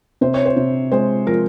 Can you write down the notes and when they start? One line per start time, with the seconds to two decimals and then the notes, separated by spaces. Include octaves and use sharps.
0.21 C3 C5
0.34 C#5
0.46 C5
0.57 C3
0.92 G#3 C5
1.26 F3 A#4